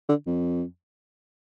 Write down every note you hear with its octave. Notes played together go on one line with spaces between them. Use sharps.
D3
F2